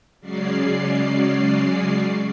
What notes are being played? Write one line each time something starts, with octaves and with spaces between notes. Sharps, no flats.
C#3 F#3 G#3 C#4 D5 C7